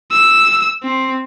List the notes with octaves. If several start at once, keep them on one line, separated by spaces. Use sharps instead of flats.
E6
C4